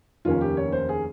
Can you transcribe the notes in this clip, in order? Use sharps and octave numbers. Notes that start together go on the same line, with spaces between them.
F1 D#2 D#3 A#3 C#4 F4
G4
C#5
C5
G#4